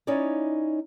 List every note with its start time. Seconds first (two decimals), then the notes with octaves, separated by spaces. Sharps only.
0.07 C#4 D#4 E4 C#5 D5